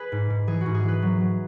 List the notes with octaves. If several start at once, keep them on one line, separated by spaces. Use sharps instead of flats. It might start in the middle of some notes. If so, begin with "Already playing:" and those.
Already playing: G#4 B4
G#2
G#2
E3 G#4
F#4
G#2
G#4
E3 B4
F#3
F#3